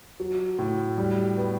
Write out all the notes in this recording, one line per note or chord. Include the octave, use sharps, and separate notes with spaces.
F#3
A2
G3
B3